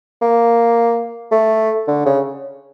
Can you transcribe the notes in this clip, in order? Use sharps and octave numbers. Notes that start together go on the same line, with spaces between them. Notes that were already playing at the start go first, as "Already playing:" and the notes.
A#3
A3
D3
C#3